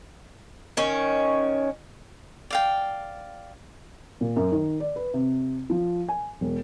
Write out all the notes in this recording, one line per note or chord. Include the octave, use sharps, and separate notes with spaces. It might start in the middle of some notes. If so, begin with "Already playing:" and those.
D#3 C#4
D5 F5 G5
A#2
F#2
D#3
D5
B4
C3
F3
G#5
E1